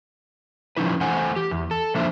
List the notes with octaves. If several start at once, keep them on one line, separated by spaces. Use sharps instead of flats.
F3 C#4 D#4 E4 B4
E3 A3 C5 F#5 G#5
G4
E2
A4
F3 A#3 D4 C5 E5